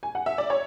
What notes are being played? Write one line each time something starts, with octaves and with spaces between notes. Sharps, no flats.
G#5
F#5
E5
D5
C#5